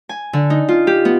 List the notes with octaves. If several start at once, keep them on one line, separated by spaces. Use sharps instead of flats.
G#5
D3
D#4
F4
G4
B3